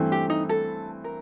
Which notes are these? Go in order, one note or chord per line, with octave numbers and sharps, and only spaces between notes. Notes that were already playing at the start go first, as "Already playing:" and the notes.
Already playing: G2 E3 A3 C4
G4
D#4
A4
A#4